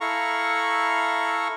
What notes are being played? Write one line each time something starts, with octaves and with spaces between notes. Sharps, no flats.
E4 A4 F5 A#5 C#6